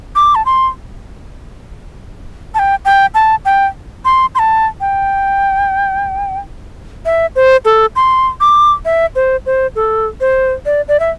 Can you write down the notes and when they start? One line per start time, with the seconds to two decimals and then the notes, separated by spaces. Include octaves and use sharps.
0.16 D6
0.35 A5
0.46 C6
2.55 A5
2.59 G5
2.85 G5
3.15 A5
3.45 G5
4.05 C6
4.35 C6
4.39 A5
4.81 G5
7.05 E5
7.36 C5
7.65 A4
7.96 C6
8.41 D6
8.85 E5
9.15 C5
9.46 C5
9.76 A4
10.21 C5
10.66 D5
10.88 D5
11.00 E5